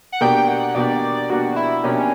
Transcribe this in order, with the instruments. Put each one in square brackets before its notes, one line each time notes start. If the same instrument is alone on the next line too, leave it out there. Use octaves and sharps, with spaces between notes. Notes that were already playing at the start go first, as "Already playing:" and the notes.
[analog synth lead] F#5
[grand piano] B2 A#3 D4 G4 [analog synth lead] G5
[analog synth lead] F#5
[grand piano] B2 A#3 D4 G4 [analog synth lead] D5
[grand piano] B2 A#3 D4 G4 [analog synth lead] F#4
[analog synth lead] E4
[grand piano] B2 A#3 D4 G4 [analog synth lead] C#4